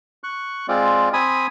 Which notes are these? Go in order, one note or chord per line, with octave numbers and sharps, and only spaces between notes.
C#6 F#6
G#3 C4 F4 D5
C4 G#5 B5 D#6